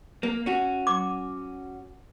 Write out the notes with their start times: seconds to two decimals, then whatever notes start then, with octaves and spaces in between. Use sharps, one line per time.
0.23 A#3
0.46 C#4 F#4
0.87 D6